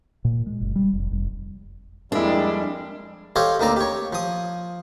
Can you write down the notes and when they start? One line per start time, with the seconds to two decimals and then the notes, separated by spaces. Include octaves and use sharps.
0.25 A#2
0.46 G#3
0.61 F#1
0.76 G3
0.93 F1
1.11 F1
2.12 F2 G3 G#3 A#3 D4 E4
3.36 G4 A4 C5 C#5 D#5 F5
3.60 D2 A#3 C4 D#4 D5 A#5
3.77 G4 C#5
4.13 F3 D#6